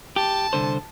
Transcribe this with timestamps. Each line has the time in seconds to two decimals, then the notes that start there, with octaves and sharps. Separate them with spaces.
0.16 G4 A5
0.53 C2 D3 C5